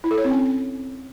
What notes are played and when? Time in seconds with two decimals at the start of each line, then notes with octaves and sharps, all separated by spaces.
0.04 E4
0.11 A4
0.18 C#5
0.24 C4
0.31 C#4